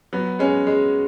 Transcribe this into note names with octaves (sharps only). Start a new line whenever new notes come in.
F#3 B3
G#3 C#4
G#3